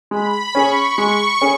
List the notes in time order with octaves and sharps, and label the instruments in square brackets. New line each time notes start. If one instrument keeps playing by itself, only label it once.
[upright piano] G#3 [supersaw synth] B5
[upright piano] C#4 G#4 [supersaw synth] C#6
[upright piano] G#3 [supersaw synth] C#6
[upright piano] C#4 G#4